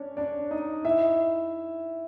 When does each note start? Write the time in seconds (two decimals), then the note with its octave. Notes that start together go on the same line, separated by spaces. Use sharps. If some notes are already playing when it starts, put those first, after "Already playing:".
Already playing: C#4 D4 C#5
0.17 D4 D5
0.51 D#4 D#5
0.85 E4 E5